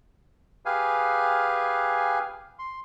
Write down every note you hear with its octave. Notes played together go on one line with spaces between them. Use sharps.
G4 G#4 B4 F5 G#5
C6